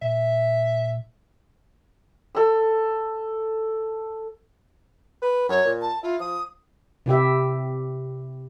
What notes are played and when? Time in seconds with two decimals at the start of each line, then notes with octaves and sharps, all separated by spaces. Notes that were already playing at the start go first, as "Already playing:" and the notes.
0.02 A#2 E5
2.35 A4 E6
5.22 B4
5.49 F#2 C#5
5.64 A#2
5.81 A5
6.03 E4 F4
6.20 F3 D#6
7.06 C3 E4 G4 E5